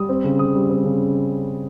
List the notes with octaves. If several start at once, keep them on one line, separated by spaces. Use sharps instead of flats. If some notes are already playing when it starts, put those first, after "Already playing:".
Already playing: G3 D#6
C4
C#3
C#3 D#6
G3
C4
C#3